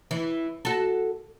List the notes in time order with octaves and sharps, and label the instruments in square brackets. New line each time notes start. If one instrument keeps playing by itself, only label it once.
[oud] E3
F#4 A4